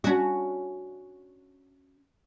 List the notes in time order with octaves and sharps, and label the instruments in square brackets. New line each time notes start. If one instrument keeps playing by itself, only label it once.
[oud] C#4 F#4